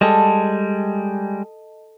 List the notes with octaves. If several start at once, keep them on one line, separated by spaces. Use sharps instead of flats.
G3 G#3 A4 D#5